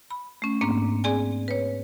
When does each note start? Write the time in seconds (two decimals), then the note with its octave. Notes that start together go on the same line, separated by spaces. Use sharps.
0.11 B5
0.42 A3 C#4
0.61 G#2 A#3 C4 D4
1.04 C4 G#4 D5 G#5
1.48 B4 C#5